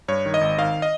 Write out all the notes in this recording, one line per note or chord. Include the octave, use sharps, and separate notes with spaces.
G2 C#5
D#3
D#5
G#1
D#3 F5
D#5